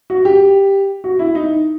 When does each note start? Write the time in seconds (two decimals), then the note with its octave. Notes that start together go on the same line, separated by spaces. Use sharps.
0.10 F#4
0.25 G4
1.04 F#4
1.19 E4
1.35 D#4